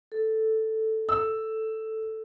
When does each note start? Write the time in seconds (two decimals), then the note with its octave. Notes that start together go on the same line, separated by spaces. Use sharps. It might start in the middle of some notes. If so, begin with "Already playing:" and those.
0.12 A4
1.09 E6